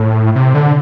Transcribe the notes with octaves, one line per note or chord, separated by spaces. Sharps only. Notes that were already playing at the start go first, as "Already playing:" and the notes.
Already playing: A2
C3
D3